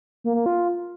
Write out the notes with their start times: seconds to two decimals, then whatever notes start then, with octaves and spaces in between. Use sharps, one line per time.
0.24 A#3
0.35 A#3
0.46 F4